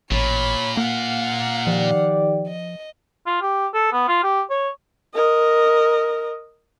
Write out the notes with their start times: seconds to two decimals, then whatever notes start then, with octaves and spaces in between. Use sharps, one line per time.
0.11 A1 A#2 C#5 B5
0.77 A#3 F5 F#5
1.67 D#3 F3 G4 D5
2.47 D#5
3.27 F4
3.42 G4
3.74 A4
3.93 B3
4.08 F4
4.23 G4
4.50 C#5
5.14 A#4 D#5